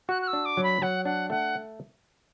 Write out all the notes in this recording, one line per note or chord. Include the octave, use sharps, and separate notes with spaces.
F#4 F#6
F#6
E6
D4
D6
F#3
B5
F#3 F#5
D4 F#5
A3 F#5